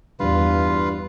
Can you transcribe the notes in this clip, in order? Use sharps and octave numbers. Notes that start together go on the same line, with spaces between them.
E2 G2 F4 B4 F5